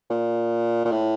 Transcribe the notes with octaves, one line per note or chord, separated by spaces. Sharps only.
A#2
A#2
A2